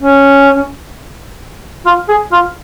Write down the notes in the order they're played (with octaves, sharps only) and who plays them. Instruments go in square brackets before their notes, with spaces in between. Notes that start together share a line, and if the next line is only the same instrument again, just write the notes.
[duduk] C#4
F4
G#4
F4